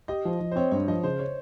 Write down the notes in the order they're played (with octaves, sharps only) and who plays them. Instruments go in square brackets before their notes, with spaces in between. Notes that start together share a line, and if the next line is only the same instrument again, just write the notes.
[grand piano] G4 [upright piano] D#5
[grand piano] F3
F3
[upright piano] C5
[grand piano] C4 [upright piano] C#5
[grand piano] G2 [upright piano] C#5
[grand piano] F3 [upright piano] D#5
[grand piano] C#3 [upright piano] C5
[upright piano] C#5